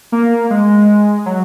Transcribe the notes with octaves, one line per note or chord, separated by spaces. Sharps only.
A#3
G#3
F#3